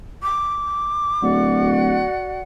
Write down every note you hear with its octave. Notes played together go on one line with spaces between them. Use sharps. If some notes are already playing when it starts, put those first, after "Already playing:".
D6
D1 F#4 D5 F#5